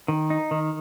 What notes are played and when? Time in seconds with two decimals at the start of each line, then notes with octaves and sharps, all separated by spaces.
0.08 D#3
0.30 D#4
0.51 D#3